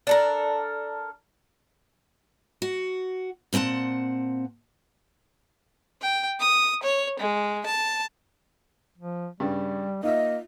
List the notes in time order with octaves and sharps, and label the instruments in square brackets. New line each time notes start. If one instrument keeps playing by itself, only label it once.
[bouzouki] D4 A4 A#4
[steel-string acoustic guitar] F#4
A#2 C4 A4 F#5 A5
[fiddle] G5
D#6
C#5
G#3
A5
[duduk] F3
[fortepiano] G2 C#3 [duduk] G3
[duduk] A#3 [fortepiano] D#4 F4 E5 [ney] D#5